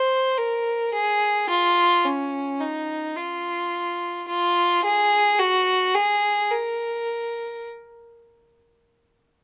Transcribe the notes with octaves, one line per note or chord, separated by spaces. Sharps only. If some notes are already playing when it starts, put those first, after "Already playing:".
Already playing: C5
A#4
G#4
F4
C#4
D#4
F4
F4
G#4
F#4
G#4
A#4